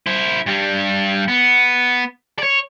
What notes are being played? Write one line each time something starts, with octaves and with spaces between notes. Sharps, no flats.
E4 C5
G2 G3
B3
C#5 D5